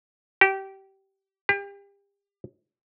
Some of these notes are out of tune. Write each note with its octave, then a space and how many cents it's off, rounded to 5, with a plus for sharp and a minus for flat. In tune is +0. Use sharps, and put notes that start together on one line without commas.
G4 -20
G4 +35